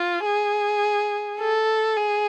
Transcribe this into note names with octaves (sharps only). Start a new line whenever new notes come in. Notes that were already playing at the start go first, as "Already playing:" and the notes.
Already playing: F4
G#4
A4
G#4